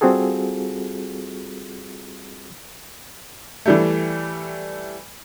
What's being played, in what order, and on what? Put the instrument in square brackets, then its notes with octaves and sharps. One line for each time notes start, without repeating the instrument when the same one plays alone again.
[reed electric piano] G3 C4 F4 F#4 G#4 A4
[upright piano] E3 G3 A3